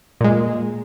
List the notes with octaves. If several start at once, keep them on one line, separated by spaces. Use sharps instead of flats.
A#2 G#3